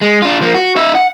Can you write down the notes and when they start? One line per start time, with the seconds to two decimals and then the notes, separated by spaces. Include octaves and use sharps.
0.01 G#3
0.22 D4 F4
0.41 F3 A#3
0.54 F#4
0.76 D#4 E5
0.95 F#5